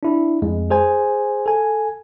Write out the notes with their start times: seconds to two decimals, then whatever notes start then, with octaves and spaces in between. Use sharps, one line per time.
0.03 D4 E4
0.42 F2 G#3
0.70 G#4 C5 G#5
1.46 A4 G#5